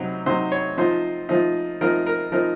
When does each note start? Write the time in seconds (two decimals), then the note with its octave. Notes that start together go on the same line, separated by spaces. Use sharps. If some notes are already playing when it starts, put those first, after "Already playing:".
Already playing: C3 F#3 C4 D#4
0.26 C3 F#3 C4 D#4 C5
0.52 C#5
0.78 F3 C4 D#4 C5
1.29 F3 C4 D#4
1.81 F3 C4 D#4 A#4
2.06 A#4
2.32 F3 C4 D#4 A#4